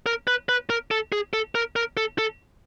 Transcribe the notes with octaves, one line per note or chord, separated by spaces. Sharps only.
A#4
B4
B4
A#4
A4
G#4
A4
A#4
A#4
A4
A4